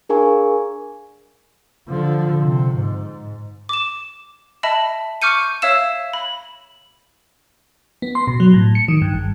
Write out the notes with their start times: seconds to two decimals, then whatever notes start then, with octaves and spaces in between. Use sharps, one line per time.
0.09 D4 G#4 A#4 F5 G#5 C#6
1.89 D3 F3
2.41 C3
2.75 G#2
3.69 D6 E7
4.63 D#5 E5 A5 B5
5.22 C#6 D6 F6 G6 C#7 D#7
5.62 C#5 E5 F5 E6 E7
6.13 B5
8.02 B3
8.15 C6
8.27 B2
8.40 F#3
8.54 A2
8.75 C#7
8.88 D#3
9.02 G2
9.13 G#1